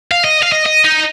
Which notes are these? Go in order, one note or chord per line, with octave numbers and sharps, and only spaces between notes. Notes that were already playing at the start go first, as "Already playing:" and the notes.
F5
D#5
F5
D#5
D#5
D#4